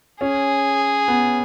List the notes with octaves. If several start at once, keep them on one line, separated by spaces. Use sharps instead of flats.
C#4 G#4
B3